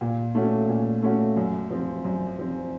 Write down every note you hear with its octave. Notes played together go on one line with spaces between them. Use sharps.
A#2
A3 C#4 F#4
A#2
A3 C#4 F#4
F#2
F3 C4
F#2
F3 C4